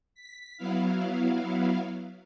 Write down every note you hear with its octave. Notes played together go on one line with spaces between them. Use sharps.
B6
F#3 B3 E4 F5